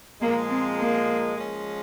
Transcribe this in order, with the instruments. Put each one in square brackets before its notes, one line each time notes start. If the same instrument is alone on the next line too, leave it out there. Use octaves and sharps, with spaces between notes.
[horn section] A#2 F3 G#3 [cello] A#3
[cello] C4
A#3
[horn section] F3 G#3 C#4